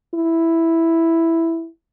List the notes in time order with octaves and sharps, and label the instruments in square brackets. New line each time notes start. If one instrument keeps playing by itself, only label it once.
[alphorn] E4